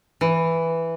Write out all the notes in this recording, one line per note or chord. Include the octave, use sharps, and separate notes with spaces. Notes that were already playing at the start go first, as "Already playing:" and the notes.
E3